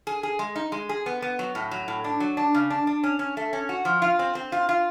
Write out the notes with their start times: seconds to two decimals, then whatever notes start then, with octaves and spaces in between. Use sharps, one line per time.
0.07 G#4
0.23 G#4
0.39 G#3
0.56 D#4
0.72 G#3
0.89 G#4
1.06 B3
1.22 B3
1.39 F#3
1.55 A2
1.71 F#3
1.88 A2
2.04 D4
2.20 F#3
2.37 D4
2.54 C#3
2.70 D4
2.87 D4
3.04 C#4
3.19 C#4
3.37 A3
3.53 C#4
3.69 F#4
3.85 F3
4.02 F4
4.19 C4
4.35 C4
4.52 F4
4.69 F4